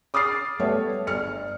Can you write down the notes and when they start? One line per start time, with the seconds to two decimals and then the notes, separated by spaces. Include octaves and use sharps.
0.14 D6 D#6 F6 A6 C7
0.59 G3 A3 B3 C#5 E5
1.07 G1 F6 C#7